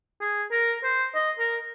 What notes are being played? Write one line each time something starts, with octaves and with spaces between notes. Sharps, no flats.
G#4
A#4
C5
D#5
A#4